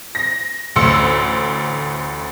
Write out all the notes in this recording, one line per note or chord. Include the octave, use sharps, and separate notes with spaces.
A#6
A1 D2 C6 E6 C#7